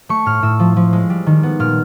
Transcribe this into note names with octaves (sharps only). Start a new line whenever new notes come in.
A3 C#6
A2 F6
A2 E6
F3
F3
G#3
G3
D#3
B3
A#2 F6